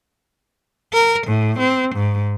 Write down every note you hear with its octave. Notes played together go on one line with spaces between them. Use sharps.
A#4
A2
C4
G#2